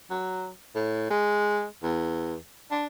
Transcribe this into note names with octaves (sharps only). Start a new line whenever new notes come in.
F#3
A2
G#3
E2
D4